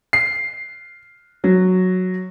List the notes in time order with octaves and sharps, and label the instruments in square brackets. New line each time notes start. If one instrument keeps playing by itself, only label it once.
[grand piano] C7
F#3